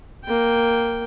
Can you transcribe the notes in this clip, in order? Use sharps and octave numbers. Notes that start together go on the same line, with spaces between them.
A#3 G5